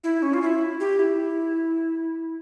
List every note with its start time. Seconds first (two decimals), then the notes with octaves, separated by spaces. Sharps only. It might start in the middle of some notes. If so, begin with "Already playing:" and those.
0.04 E4
0.22 C#4
0.34 F4
0.42 E4
0.80 G4
0.99 E4